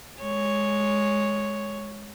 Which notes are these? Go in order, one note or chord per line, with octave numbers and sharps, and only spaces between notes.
G#3 C#5